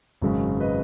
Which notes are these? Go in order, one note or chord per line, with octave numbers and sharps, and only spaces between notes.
G#1 F#2 C#3 G#3
B4 D#5